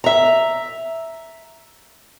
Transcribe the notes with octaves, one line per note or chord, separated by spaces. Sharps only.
E5 A#5